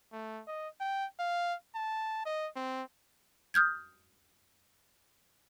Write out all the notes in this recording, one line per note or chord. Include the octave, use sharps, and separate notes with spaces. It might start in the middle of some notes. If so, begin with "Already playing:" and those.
A3
D#5
G5
F5
A5
D#5
C4
D#6 F6 G6 G#6